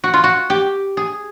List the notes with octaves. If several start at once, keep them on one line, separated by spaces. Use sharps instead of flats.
F#4
F4
F#4
G4
G#4